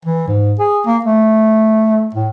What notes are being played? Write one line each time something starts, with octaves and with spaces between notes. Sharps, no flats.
E3
G#2
G#4
A#3
A3
A2